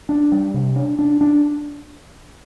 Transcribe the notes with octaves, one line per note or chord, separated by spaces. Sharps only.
D4
G3
C3
D4
D4
D4